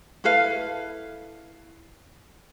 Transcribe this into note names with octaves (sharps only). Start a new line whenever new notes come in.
E4 A4 B4 F5